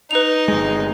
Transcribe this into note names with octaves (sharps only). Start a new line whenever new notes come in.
D#4 B4 F7
G1 G#3